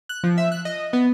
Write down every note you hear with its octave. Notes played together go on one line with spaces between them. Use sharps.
F#6
F3
E5
F#6
D#5
B3